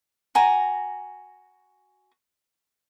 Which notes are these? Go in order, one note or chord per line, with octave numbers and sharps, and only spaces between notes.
F#4 G#5 A#5